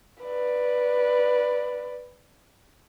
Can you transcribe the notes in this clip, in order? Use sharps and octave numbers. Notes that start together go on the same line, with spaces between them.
B4 D5